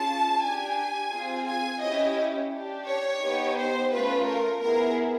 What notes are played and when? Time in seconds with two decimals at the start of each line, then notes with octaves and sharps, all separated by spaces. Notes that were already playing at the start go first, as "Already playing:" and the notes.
Already playing: C#4 F4 G#4 A5
0.42 D4 G4 G#5
1.11 C4 F4 G#4
1.47 G#5
1.82 C#4 E4 G4 D#5
2.52 D4 G4
2.87 C#5
3.21 B3 D#4 G4
3.56 C5
3.91 A3 C#4 F4 B4
4.27 A#4
4.61 B3 E4 G#4 A#4